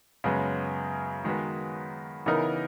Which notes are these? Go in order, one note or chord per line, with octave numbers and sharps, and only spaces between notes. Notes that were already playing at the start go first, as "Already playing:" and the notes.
F#2 C#3 G#3 B3
D#3 G#3 B3 F#4 B4
C#3 E3 B3 D#4 A#4